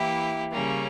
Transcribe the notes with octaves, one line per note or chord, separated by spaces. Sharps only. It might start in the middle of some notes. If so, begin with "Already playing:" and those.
Already playing: E3 A#3 E4 G4
C#3 G3 A#3 C#4